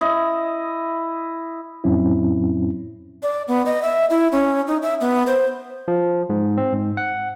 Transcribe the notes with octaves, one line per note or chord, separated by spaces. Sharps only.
E4 D#5
F2 A2 F#3 C4 C#4 E4
D5
B3
D#5
E5
E4
C#4
D#4
E5
B3
C5
F3
G#2
C4
G#2
F#5